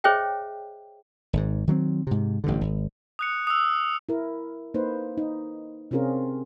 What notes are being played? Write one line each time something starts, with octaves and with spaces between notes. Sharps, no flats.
G#4 C5 C#5 D#5 E5 G5
G#1 G#2
D#3 F#3 A3 C4
G#2 C3
A1 G2 D3
G#1
D#6 F#6 C#7
D#6 E6
E4 A#4
A#3 D#4 B4 C5
D#4
C3 C4 C#4 F4 G#4 A#4